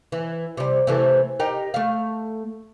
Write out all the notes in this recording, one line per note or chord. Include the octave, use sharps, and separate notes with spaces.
E3
C3 G3
C3 E3 A3
D#4 G4 A#4
A3 F5